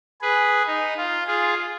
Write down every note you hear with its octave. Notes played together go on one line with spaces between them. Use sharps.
G#4 B4
D#4
F4
F4 G#4